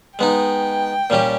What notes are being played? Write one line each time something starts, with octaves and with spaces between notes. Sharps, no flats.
G#3 B3 D#4 G5
A#2 G3 C#4 G4